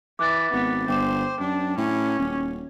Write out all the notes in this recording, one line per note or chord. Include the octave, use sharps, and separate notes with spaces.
E3 D6 F#6 A6
G#1 B3
G1 C5 G5 D6 E7
F#2 D4
A2 C#4
D#1